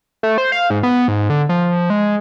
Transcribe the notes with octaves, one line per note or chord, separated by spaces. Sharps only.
A3
C5
F5
G#2
B3
G#2
D3
F3
G#3